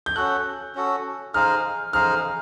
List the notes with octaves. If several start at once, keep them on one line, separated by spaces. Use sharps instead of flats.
G6
C#4 F#4 A4 F#6
C#4 F#4 A4
D#4 G#4 C5 F5 F6
D#4 G#4 C5 F5 F6